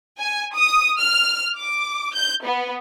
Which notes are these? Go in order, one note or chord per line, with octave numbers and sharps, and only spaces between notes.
G#5
D#6
F6
D6
G6
B3